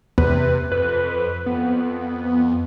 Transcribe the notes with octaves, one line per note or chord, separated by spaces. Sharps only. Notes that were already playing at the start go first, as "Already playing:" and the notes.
E2 C3 B4
F2 B4
F2 B3